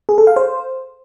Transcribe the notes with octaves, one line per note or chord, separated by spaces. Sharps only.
G#4
A4
F5
C5